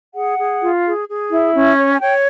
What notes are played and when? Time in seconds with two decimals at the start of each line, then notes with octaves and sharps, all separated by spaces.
0.15 G#4 F#5
0.38 G#4
0.61 F4
0.85 G#4
1.08 G#4
1.31 E4
1.54 C#4
1.77 C#5
1.92 G#5
2.00 C#5 G5